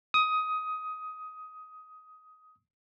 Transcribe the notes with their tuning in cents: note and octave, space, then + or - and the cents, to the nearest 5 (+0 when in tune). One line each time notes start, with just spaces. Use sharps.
D#6 +15